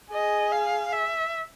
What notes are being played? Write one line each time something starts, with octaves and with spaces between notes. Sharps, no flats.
G#4 D#5
F5
E5